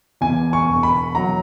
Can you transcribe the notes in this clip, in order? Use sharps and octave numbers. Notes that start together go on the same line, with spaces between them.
E2 G#5
C#6
E1
B5
F#3 A#5